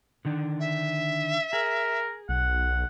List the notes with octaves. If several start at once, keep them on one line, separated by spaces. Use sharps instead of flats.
D3 D#3 D4
E5
G#4 A#4
B1 F#5